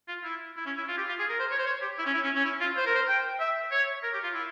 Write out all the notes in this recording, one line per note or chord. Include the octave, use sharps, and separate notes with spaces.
F4
E4
E4
C#4
E4
F4
G4
F4
G#4
A#4
C5
C#5
C5
C#5
G4
E4
C#4
E4
C#4
C#4
E4
F4
C5
A#4
C5
G5
E5
C#5
A#4
G4
F4
E4